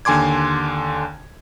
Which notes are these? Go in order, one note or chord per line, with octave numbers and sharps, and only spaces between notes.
D#2 D3 G#5 C6 D6 G#6